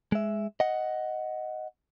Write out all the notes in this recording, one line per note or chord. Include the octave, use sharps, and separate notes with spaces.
G#3 E5
D#5 F#5